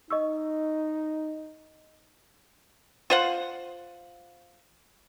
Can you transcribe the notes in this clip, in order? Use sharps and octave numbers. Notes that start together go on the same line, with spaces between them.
D#4 D#5 C#6 E6
F4 C5 F#5